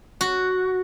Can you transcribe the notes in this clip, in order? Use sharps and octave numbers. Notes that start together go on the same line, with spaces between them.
F#4